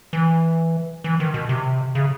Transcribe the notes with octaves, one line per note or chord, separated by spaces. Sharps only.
E3
E3
D#3
B2
C3
C#3